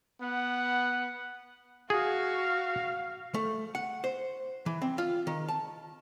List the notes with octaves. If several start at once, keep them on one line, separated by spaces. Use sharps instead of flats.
B3 F#5
F#4 G#4 F5
A3
F#5
C5
E3
C4
F4
D#3
A5